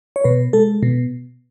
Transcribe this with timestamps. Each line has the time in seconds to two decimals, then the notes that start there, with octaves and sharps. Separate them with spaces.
0.16 C#5
0.24 B2 B4
0.53 G#3 A4
0.83 B2